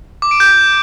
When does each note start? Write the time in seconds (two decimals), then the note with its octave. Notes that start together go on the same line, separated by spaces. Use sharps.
0.22 D6
0.31 D7
0.40 G6